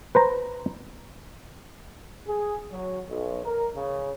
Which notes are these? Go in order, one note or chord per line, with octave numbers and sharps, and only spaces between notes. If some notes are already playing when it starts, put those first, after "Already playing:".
B4 C5 A#5
G#4
F#3
B1
A#4
C#3